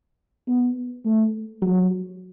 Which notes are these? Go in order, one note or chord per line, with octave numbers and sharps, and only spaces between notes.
B3
A3
F#3